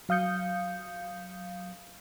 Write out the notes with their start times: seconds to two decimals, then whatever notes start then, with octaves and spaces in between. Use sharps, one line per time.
0.09 F#3 F5 D#6 G6 C#7